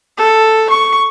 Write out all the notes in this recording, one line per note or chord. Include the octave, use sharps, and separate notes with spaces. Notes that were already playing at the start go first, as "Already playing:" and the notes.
A4
C#6